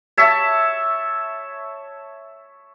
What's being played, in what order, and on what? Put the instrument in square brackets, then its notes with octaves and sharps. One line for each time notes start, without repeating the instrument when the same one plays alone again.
[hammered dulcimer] C#5 E5 A5